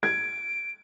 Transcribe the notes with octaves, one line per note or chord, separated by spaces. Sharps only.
G#6 D7